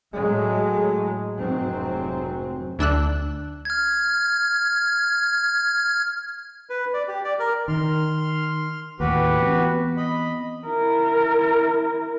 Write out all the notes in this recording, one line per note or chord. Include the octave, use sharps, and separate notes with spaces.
A2 F#3 G#3
F1 G#2 F#3 C4
D2 D4 E6 F#6
F6 G#6
B4
D5
G4
D5
A#4
D#3 C6 F6
D#2 A2 F#4 G4 B4
E3 B3 C4
D#5 B5
E4 A#4